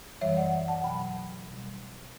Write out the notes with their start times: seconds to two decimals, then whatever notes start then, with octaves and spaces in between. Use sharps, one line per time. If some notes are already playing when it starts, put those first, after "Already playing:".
0.21 F#2 E3 G3 C#5 E5
0.37 D5 F#5
0.68 F#5 A5
0.84 B2 F#3 G5 B5
1.47 B2 G3